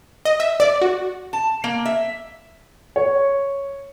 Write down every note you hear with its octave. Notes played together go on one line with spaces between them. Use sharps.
D#5
E5
D5
F#4
A5
A#3
E5
C#5